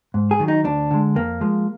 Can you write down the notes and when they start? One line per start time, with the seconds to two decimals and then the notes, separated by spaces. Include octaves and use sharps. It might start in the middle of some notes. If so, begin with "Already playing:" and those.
0.14 G#2
0.31 G#4
0.39 D#3 F#3
0.48 D#4
0.64 D2 D4
0.91 D3 G#3
1.15 F2 A#3
1.41 F3 G#3